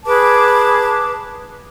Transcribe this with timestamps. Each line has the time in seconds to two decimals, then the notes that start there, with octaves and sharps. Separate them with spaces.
0.06 G#4 B4 A5 D6